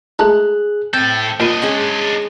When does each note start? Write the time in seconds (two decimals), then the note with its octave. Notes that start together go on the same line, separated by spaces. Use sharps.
0.19 G#3 A3 D#4 G#4 F#6
0.93 A2 C4 A4 G6
1.40 A#2 D4 D#5 B5
1.62 G#3 C#4 G#4